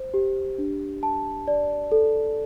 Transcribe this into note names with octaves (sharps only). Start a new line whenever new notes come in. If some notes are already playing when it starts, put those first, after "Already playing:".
Already playing: C5
G4
D4
A5
D5
A4